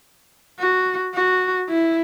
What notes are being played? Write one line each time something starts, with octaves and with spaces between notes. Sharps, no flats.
F#4
F#4
E4